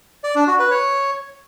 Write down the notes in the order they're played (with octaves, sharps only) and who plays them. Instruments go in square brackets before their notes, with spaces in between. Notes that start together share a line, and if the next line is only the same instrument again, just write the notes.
[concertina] D5
D4
F#4
B4
C#5